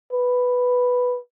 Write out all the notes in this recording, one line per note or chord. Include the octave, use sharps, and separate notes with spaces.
B4